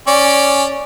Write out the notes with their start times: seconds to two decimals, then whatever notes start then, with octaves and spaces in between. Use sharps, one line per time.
0.07 C#4 D5